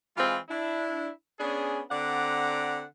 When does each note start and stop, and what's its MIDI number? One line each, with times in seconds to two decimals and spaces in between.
0.17 0.38 52
0.17 0.38 56
0.17 0.38 60
0.17 0.38 65
0.49 1.09 62
0.49 1.09 64
1.39 1.80 59
1.39 1.80 61
1.39 1.80 62
1.39 1.80 68
1.90 2.82 50
1.90 2.82 60
1.90 2.82 74
1.90 2.82 78
1.90 2.82 82